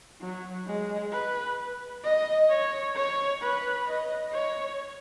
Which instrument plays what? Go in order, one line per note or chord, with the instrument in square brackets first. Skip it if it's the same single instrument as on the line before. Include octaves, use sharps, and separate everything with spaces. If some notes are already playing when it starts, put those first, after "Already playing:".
[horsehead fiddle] F#3
G#3
B4
D#5
C#5
C#5
B4
D#5
C#5